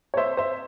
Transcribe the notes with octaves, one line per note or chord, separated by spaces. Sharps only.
C#5
C5 E5
C5 E5